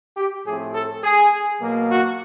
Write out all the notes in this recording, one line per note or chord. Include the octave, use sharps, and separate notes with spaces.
G4
A2 F3 A3 C4 G#4
A4
G#4
B2 F#3 A#3
F#4